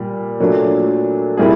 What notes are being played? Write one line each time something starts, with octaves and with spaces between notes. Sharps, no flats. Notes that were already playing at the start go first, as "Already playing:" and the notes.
Already playing: A#2 G3
A#2 F#3 A3 D4
A#2 G3 C4 E4 G#4